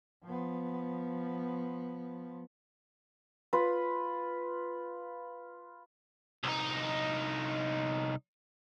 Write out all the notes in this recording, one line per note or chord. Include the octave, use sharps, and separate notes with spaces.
F3 B3
F4 B4
C2 D#4